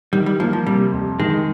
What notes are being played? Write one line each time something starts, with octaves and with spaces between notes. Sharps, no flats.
D#3 G3
G3
F3 A#3
F3
C3 G3
F2
D#3 G#3